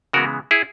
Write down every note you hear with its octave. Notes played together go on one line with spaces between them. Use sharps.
C#3 E3 G#3 B3 F#4 A#4
E4 G#4